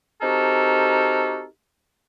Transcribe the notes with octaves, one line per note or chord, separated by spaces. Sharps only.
C4 D#4 F#4 G4 A4 A#4